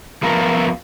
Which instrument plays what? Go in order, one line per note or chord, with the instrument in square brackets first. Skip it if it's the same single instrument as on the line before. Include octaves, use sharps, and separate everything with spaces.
[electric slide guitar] F3 A3 B3 F4 A#4